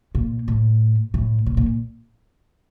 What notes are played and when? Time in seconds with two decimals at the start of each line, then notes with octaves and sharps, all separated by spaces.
0.15 A#2
0.48 A2
1.14 A2
1.46 A#2
1.57 A#2